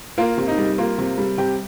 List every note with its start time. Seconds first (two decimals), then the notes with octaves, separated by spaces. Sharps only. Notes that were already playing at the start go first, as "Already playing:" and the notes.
0.18 A#3 F4
0.37 C3
0.48 D#4
0.58 G3
0.78 A#3 F4
0.98 C3
1.18 G3
1.38 C3 G4 G5